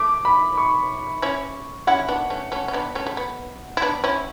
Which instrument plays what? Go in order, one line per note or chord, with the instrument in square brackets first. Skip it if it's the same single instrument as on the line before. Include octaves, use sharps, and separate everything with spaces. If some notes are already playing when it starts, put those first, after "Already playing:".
Already playing: [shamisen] A3 [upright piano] D6
[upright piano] B5
C#6
[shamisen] C#4 E4
[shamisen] C#4 E4 [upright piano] F#5
[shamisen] B3 D4
A3 C#4
A3 C#4
C#4
B3 D4
A3 C#4
A3
B3
E4
B3 D4
C#4 E4